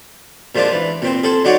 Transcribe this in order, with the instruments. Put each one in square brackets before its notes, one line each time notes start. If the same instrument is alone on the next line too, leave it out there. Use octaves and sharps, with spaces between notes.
[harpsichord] A#2 F3 G#3 D4 F4
E3
A#2 C4 C5
G#4 A4 C5
F#3 D4 D#4 F#4 C#5 D5